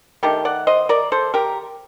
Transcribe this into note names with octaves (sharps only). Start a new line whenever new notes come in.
D#3 A3 D4 G4
D5 F#5
C5 D#5
A#4 D5
A4 C5
G4 A#4